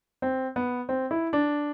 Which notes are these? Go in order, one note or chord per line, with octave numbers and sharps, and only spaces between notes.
C4
B3
C4
E4
D4